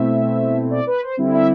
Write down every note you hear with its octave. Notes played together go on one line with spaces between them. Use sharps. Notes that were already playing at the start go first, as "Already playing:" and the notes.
Already playing: B2 A3 C4 E4 E5
D5
B4
C5
D3 G3 C4 E4
E5